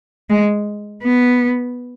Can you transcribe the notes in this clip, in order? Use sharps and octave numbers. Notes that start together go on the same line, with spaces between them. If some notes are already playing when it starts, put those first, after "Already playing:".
G#3
B3